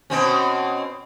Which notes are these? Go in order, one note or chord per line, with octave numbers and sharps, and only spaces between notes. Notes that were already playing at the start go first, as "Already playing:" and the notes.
B2 C4 C#4